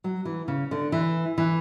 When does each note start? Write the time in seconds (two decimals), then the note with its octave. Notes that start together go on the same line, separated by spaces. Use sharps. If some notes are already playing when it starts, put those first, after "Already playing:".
0.04 F#3
0.25 E3
0.48 C#3
0.71 D3
0.92 E3
1.38 E3